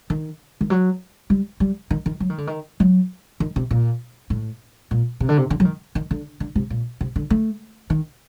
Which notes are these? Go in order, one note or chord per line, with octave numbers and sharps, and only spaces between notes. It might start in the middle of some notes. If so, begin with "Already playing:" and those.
D#3
D#3
F#3
G3
G3
D#3
D#3
F#3
D#3
D3
D#3
F#3
D#3
C3
A#2
A2
A#2
C3
D3
C3
D3
F#3
D#3
D#3
D3
D3
C3
A#2
C3
D3
A3
D#3